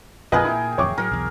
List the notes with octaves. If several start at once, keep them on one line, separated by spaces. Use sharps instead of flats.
A#1 F2 F4 G#4 A#4 B4 D#5 G5
A#2 E4
D1 F2 C#5 C#6 D6
A2 F#3 A#4
B1 E2